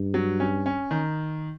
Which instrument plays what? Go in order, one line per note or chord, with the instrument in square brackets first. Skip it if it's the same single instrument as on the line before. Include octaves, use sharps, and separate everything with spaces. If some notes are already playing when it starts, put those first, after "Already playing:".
Already playing: [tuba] G2
[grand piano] F#3
C#4
C#4
D#3